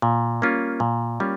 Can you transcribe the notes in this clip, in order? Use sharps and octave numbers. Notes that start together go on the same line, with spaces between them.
A#2
G3 A#3 C#4 F4
A#2
G3 A#3 C#4 F4